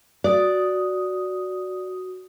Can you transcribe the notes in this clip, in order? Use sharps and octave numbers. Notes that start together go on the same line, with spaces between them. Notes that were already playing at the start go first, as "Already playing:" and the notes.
F#4 D5 D#6